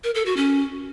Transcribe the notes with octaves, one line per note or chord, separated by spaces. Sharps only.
A#4
A4
F#4
C#4